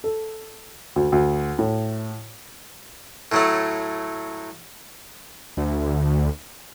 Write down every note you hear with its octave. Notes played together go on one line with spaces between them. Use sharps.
A4
D2
D2
A2
A2 F#3 A3
D2